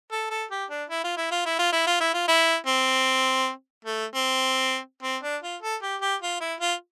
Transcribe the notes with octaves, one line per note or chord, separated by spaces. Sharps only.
A4
A4
G4
D4
E4
F4
E4
F4
E4
F4
E4
F4
E4
F4
E4
C4
A3
C4
C4
D4
F4
A4
G4
G4
F4
E4
F4